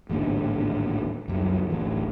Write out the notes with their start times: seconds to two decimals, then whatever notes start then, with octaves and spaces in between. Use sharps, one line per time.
0.09 A1 D#2 G#2 D3
1.28 C#2 F#2 G3
1.70 D1 A1 E3